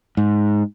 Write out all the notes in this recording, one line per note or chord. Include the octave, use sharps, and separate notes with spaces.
G#2